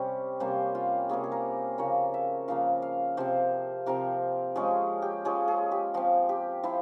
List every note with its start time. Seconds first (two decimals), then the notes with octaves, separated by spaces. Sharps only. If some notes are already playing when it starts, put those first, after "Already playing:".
Already playing: C3 G3 C#4 G5
0.40 C3 G3 A#3 C#4 C5
0.75 F4
1.09 C3 G3 A#3 C#4 G#4
1.24 G#4
1.32 A#4
1.78 C#3 F3 A#3 C#5
2.14 E5
2.48 C#3 F3 A#3 F5
2.82 F5
3.17 C3 F3 C4 C5
3.86 C3 F3 C4 A#4
4.55 F3 G#3 C#4 G#4
5.02 G4
5.25 F3 G#3 C#4 G#4
5.48 G#4
5.72 G4
5.94 F3 C4 F4
6.29 G4
6.63 F3 C4 E4